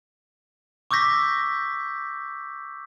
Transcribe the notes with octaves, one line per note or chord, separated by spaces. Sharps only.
C#6 D6 E6 G6 A#6 B6